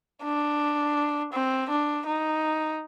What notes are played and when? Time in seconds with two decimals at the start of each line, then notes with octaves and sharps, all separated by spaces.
0.23 D4
1.33 C4
1.69 D4
2.06 D#4